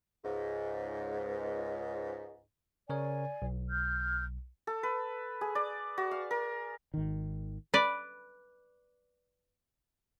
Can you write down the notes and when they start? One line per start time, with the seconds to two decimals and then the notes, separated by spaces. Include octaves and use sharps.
0.24 C#2 G#2
2.90 C#3 A#4 C#5 D5 G#5
3.42 B1
3.69 F6 G6
4.67 A4
4.83 B4
5.41 G#4
5.55 D5
5.98 F#4
6.11 F5
6.31 A#4
6.94 G#1 D#3
7.74 B4 D5